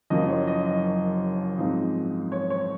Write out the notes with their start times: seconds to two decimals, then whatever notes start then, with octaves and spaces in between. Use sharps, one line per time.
0.10 F#1 F#2 F3 D#5
0.29 C#5
0.47 D#5
0.66 D#5
1.58 G#2 F3 C4 D#4
2.32 C#5
2.50 C#5